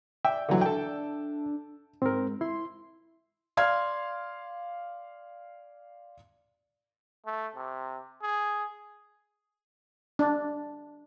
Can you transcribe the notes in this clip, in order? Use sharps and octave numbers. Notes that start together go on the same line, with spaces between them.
D5 E5 G5
D3 E3 F#3
D4 A4 G5
G#2 C4 A#4
E4 C6
D5 F5 C6 F6 G#6
A3
C3
G#4
D4